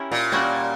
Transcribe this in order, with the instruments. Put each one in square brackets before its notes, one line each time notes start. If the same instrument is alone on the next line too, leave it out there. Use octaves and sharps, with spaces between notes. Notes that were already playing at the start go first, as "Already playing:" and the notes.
Already playing: [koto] C#4 E4 G4 A#4
[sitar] A#2
[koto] G3 A#3 C#4 F#4 A#4